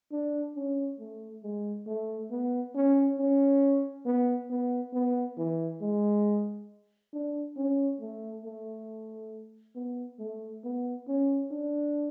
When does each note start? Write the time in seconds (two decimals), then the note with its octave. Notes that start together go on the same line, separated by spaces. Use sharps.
0.12 D4
0.56 C#4
1.00 A3
1.44 G#3
1.87 A3
2.31 B3
2.75 C#4
3.19 C#4
4.06 B3
4.50 B3
4.93 B3
5.38 E3
5.82 G#3
7.13 D4
7.57 C#4
8.01 A3
8.45 A3
9.76 B3
10.19 A3
10.64 B3
11.08 C#4
11.51 D4